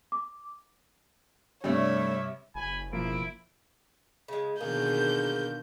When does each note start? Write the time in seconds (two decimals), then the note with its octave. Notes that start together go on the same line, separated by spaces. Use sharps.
0.12 D6
1.64 G2 C3 G3 A3 C#5 E5
2.55 F#1 G#5 B5
2.93 B1 F3 A#3 E4 D7
4.28 C#3 G#3
4.61 B2 D3 D#3 A#3 G#4 G6